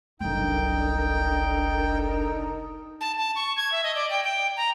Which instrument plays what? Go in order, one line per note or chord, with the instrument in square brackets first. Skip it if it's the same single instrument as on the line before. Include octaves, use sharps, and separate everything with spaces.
[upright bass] F#1 C2 [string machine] D4 A4 A#4 [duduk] D#4 [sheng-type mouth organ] G5
[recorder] A5
A5
C#6
G#6
E5
D#5
D5
G5
G5
A#5